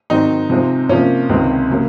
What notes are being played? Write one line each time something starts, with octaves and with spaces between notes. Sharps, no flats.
G#2 D#3 F#3 C4 D#4
C3 F3 G#3 C4
C3 F3 A#3 C#4
C#2 C3 D#3 G#3 C4
C#3 F#3 A#3